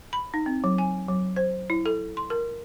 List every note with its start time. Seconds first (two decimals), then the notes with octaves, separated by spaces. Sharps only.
0.13 B5
0.34 D#4
0.46 C4
0.64 F#3
0.78 G#5
1.08 F#3
1.36 C5
1.70 E4
1.86 A4
2.17 C6
2.30 A#4